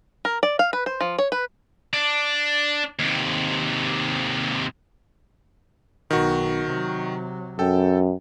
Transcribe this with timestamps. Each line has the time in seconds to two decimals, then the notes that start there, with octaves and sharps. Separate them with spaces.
0.25 A#4
0.43 D5
0.59 F5
0.73 B4
0.86 C5
1.01 F3
1.18 C#5
1.32 B4
1.93 D4
2.99 D#2 C3
6.11 B1 D#3 F#4
6.67 C3 F#3
7.59 F#2 A4 G5